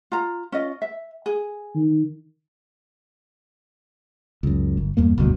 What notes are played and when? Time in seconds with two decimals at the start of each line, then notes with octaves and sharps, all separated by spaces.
0.12 F4 A#5
0.52 C#4 F4 D#5
0.82 E5
1.26 G#4
1.75 D#3
4.43 C#2 F#2
4.77 G1
4.97 E2 G2 A#3
5.18 F#1 D2 G2 B2